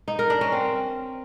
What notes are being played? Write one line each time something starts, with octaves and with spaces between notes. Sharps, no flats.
D#4
A#4
D4
C#4
C4